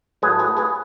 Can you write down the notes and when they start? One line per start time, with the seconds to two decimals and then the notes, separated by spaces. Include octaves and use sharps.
0.22 A2 F#3 G#4 B4
0.31 A4
0.39 G#4 B4
0.57 G#4 B4